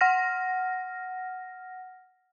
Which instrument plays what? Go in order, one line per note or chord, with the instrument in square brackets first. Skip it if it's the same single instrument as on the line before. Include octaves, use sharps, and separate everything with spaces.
[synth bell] F#5 F6 A#6